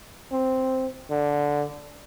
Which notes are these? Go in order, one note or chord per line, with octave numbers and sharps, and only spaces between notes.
C4
D3